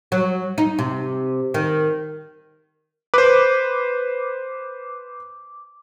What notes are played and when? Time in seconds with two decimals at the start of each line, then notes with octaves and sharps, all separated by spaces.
0.12 F#3
0.58 D#4
0.79 C3
1.54 D#3
3.14 B4 C5 D6